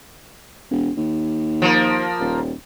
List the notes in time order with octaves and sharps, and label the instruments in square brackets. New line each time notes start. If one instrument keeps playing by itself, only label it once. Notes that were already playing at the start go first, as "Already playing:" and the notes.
[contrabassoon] E1
D#2
[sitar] F3 A#3
[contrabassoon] D#1